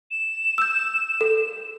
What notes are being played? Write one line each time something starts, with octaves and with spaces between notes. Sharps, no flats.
E7
E6 G6
A4